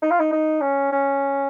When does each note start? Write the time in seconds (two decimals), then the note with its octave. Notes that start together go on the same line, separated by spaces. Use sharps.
0.02 D#4
0.11 F4
0.20 D#4
0.32 D#4
0.61 C#4
0.92 C#4